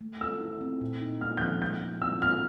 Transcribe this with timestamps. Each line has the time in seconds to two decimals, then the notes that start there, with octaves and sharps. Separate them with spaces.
0.01 A3
0.21 A4 E6
0.41 E4
0.61 C4
0.81 A#2
1.01 D#4
1.21 A#3 F6
1.37 G6
1.41 F3 F#6
1.62 G#3 G6
1.82 G#3
2.02 E4 E6
2.22 B3 F6